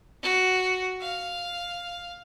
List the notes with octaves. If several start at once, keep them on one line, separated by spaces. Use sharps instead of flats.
F#4
F5